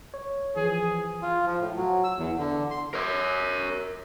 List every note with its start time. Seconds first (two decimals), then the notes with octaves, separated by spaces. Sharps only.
0.14 C#5
0.56 E3 F3 G#4
1.23 F4
1.46 F3
1.60 A2
1.76 F#3
2.04 E6
2.18 E2
2.38 D3
2.71 C6
2.94 A#4 C#5